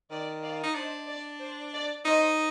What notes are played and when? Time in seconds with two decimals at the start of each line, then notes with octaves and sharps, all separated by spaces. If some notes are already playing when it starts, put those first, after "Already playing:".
0.10 D#3 D5
0.42 D5 F5
0.63 D#4
0.75 D4 C5 D#5
1.08 D5
1.40 C5
1.73 D5
2.05 D#4 C5 D#5